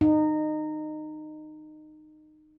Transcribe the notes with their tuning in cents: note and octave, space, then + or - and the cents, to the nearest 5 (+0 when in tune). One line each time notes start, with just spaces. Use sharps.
D#4 -20